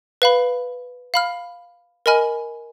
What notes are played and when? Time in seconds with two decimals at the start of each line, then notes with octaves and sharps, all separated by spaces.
0.22 B4 F5 B5
1.14 F5 B5 F6
2.06 A#4 D#5 G#5 B5 F6